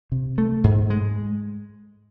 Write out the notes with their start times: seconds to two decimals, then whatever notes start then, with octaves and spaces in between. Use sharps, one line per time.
0.12 C3
0.38 A3
0.64 G#2
0.90 G#3